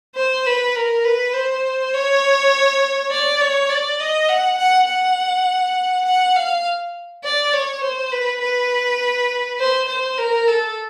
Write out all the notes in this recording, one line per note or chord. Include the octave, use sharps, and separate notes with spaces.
C5
B4
A#4
B4
C5
C#5
D5
C#5
D5
D#5
F#5
F#5
F#5
F#5
F5
D5
C#5
C5
B4
B4
C5
C5
A#4
A4